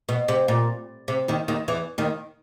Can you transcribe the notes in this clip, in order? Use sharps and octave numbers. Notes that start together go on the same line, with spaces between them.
B2
C3
A#2
C3
D#2 D#3
D#2 D#3
E2 E3
D#2 D#3